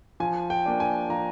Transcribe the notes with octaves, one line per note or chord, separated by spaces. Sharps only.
F3 G#5
G5
A#3 D4
G#5
F3 A#5